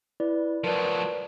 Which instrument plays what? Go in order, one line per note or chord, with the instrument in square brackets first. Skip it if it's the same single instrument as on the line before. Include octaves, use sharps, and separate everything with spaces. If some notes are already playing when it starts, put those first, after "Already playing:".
[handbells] E4 B4 D5
[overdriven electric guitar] F3 F#3 [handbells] A#4 B4 D5